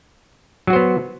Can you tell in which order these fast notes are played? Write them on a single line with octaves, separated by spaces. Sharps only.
F#3 F#4 C5 B3